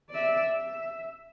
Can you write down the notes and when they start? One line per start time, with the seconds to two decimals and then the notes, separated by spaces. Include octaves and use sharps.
0.10 D5 E5
0.53 E5